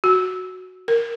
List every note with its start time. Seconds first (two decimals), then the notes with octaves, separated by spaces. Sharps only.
0.04 F#4
0.88 A#4